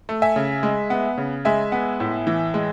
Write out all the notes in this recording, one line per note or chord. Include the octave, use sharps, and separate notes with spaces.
A3
E5 G#5
C#3
G#3
B3
C#3
G#3 E5 G#5
B3
A2
E3
G#3